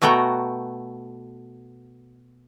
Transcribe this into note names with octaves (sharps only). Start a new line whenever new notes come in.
B2 A3 B3 F#4 G5 A#5